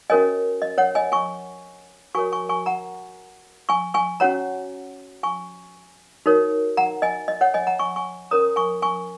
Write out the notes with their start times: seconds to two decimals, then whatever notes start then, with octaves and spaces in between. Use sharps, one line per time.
0.10 C#4 F#4 A#4 C#5 D#5 G#5
0.62 D#5
0.78 C#5 F#5
0.95 D#5 G#5
1.12 G#5 C#6
2.15 F#4 A#4 C#5 G#5 C#6
2.32 G#5 C#6
2.49 G#5 C#6
2.66 F#5 A#5
3.69 G#5 C#6
3.94 G#5 C#6
4.20 C#4 F#4 C#5 F#5 A#5
5.23 G#5 C#6
6.26 D#4 F#4 A#4 C#5
6.77 F#5 A#5
7.02 D#5 G#5
7.28 D#5
7.41 C#5 F#5
7.54 D#5 G#5
7.67 F#5 A#5
7.79 G#5 C#6
7.96 G#5 C#6
8.31 C#4 A#4 C#5 A#5 D#6
8.56 G#5 C#6
8.82 G#5 C#6